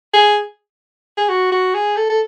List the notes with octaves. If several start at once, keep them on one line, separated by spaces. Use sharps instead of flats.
G#4
G#4
F#4
F#4
G#4
A4
A4